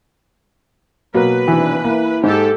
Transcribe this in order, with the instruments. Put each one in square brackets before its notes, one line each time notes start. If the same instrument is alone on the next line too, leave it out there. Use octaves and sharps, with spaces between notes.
[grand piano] B2 F#3 A#3 [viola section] B4
[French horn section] D#2 C3 D4 [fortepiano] E3
[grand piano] A#3 [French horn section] E4
[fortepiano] G#2 [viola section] G4 A4